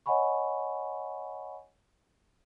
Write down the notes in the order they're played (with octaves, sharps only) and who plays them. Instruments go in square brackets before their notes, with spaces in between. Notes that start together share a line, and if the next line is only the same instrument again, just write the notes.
[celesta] C#5 D#5 F#5 G#5 B5 C#6